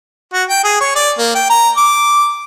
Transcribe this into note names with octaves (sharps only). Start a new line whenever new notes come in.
F#4
G5
G#4
C#5
D5
A#3
G5
A#5
D6